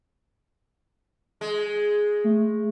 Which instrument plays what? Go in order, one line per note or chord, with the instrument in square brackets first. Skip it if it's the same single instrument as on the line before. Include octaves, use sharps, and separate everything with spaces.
[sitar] G#3
[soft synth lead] A3